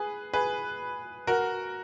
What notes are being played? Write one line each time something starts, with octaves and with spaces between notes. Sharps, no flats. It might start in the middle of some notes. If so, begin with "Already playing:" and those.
Already playing: G#4 B4
G#4 B4
F#4 A#4